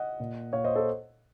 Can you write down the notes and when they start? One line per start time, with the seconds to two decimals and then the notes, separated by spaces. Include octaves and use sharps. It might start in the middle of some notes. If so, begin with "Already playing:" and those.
Already playing: D#5 F#5
0.20 A#2
0.53 A#2 C#5 F5
0.64 C5 D#5
0.75 A4 C5